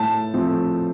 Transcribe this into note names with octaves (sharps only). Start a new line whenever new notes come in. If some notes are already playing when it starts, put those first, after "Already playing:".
Already playing: A2 A5
F3 A3 C4